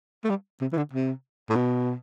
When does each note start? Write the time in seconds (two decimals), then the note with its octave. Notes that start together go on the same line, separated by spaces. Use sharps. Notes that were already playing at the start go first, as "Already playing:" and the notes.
0.24 A3
0.30 G3
0.61 C3
0.72 E3
0.77 D3
0.93 C3
1.50 A2
1.55 B2